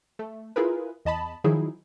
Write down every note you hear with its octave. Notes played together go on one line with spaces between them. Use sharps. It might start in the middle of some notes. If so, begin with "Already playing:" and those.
A3
E4 F4 G#4 A#4 B4
E2 D#5 A5 B5
D#3 F3 F#3 D#4 E4 G#4